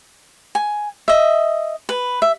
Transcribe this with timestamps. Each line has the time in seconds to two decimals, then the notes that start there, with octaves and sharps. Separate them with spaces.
0.55 G#5
1.08 D#5 E5
1.89 B4
2.22 E5